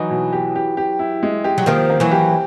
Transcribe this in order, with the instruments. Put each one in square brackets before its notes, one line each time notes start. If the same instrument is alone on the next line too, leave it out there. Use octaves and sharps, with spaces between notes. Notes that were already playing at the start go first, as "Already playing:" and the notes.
Already playing: [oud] E3 F#3 [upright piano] D#4
[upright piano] B2
G4
G4
G4
E4
G#3
G4
[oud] F#3
[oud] D#3 F3 [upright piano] A#3
[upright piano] A#3
[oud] E3 F#3
[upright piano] G4